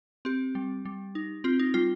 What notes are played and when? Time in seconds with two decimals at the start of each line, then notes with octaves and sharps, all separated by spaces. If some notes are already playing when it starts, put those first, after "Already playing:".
0.25 C4 G4
0.55 G3
0.85 G3
1.15 D#4
1.44 C4 F4
1.59 D#4
1.74 G3 F4